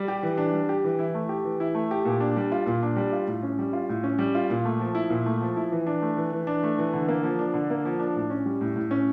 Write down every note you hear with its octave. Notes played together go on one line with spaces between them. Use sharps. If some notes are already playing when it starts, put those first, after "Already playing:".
Already playing: G3
G4
E3
D4
G3
G4
E3
E4
A3
G4
E3
E4
A3
G4
A#2
D4
G3
F4
A#2
D4
G3
F4
A2
C#4
G3
F4
A2
C#4
G3
F4
A#2
A3
F3
E4
A#2
A3
F3
E4
E3
D4
A3
E3
E3
D4
A3
E3
D3
A#3
F3
D4
D3
A#3
F3
D4
A2
C#4
G3
A2
A2
C#4